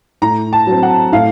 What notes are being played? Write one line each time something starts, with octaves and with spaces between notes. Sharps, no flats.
A2 A#5
A5
F#3 C4
F#5
A2 F5